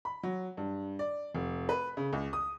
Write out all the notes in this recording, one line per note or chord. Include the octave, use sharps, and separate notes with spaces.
B5
F#3
G2
D5
F1
B4
C#3
C#2
D#6